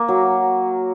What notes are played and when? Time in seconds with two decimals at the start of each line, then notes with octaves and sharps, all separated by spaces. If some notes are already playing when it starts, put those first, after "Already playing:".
Already playing: A#3
0.08 F#3